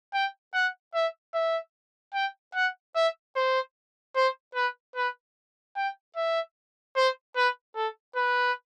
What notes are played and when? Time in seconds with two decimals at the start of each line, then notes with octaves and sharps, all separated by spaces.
0.14 G5
0.54 F#5
0.94 E5
1.34 E5
2.14 G5
2.54 F#5
2.95 E5
3.36 C5
4.16 C5
4.55 B4
4.96 B4
5.76 G5
6.16 E5
6.96 C5
7.36 B4
7.75 A4
8.16 B4